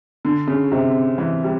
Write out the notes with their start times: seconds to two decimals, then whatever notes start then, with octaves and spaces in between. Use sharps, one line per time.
0.25 D3
0.47 C#3
0.72 C3
1.18 E3
1.44 G3